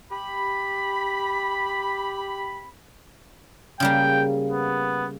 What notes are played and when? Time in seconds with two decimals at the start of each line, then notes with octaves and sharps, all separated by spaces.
0.11 G4 B5
3.80 C#3 G3 A#3 G5
4.51 B3